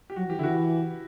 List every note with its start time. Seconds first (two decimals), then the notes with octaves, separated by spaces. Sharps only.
0.10 G4
0.16 F#3 F#4
0.27 E3
0.30 G4
0.38 D3 E4
0.43 E3 F#4